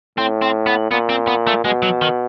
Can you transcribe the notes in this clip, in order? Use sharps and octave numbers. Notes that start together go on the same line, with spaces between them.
A2 C4
C4
B3
A#2 B3
C4
B3
A3
B2 G#3
F#3
D#3